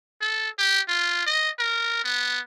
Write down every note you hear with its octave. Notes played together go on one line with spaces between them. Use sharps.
A4
G4
F4
D#5
A#4
B3